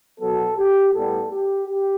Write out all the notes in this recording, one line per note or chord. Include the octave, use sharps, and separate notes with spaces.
B2 F#3 B3 A4
G4
A2 G3 B3 A4
G4
G4